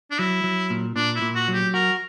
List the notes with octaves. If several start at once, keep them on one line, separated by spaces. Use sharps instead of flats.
D4
F#3 E4
F#3
A#2
A#2 D4
E4
A#2
F#4
F#3
G4
F#4 A#4